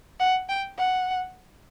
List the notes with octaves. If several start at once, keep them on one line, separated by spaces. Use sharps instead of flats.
F#5
G5
F#5